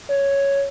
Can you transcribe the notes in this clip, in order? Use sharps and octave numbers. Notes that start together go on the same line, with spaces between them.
C#5